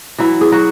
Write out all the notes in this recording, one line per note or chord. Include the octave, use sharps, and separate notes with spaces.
E3 F#3 E4
G#4
F#3 F#4